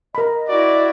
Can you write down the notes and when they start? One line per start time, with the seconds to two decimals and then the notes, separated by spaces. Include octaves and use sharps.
0.15 A#4 D#5 B5
0.48 E4 F#4 D5